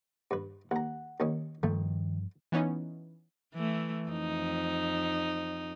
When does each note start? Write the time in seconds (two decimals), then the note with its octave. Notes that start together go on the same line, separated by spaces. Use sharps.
0.31 G2 B4
0.71 D#2 F#5 A#5
1.20 D#2 D#3 C#4
1.63 G2 D#3 F3 A3
2.52 E3 B3 C#4 D#4
3.54 E3 A3
4.09 F2 D#4